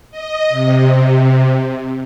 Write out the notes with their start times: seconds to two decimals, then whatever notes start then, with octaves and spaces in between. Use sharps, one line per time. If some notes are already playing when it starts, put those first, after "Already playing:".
0.11 D#5
0.50 C3